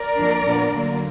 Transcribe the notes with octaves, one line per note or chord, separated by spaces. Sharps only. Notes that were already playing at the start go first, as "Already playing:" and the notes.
Already playing: A#4 D5
F2 D#3 A#3 D4
A#2 F3 B3 D4
D3 F#3 A#3